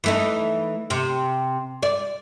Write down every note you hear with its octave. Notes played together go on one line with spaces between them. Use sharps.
E3 A3 D#4
C3 C4
D5